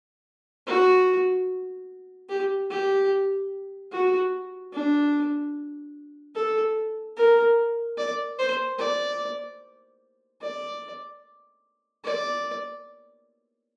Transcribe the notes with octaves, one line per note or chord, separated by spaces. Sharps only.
F#4
G4
G4
F#4
D4
A4
A#4
D5
C5
D5
D5
D5